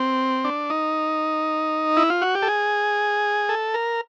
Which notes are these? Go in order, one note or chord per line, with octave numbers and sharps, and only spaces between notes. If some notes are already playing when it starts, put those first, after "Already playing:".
Already playing: C4
D4
D#4
E4
F4
F#4
G4
A4
G#4
A4
A#4